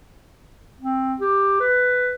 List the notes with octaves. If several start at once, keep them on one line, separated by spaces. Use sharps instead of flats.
C4
G4
B4